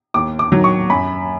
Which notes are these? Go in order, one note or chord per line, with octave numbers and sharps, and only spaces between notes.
D#2 D6
D6
D#3 F#3
C#6
F#2 B5